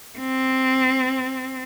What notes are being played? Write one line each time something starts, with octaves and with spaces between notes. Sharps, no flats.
C4